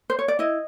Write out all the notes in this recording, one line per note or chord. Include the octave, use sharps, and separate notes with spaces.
C5
C#5
D5
E4 D#5